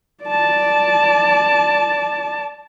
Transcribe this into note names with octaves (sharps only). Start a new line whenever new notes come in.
D5 A5